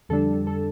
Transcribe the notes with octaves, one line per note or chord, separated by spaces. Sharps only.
F2 D3 G3 D4 A4
A4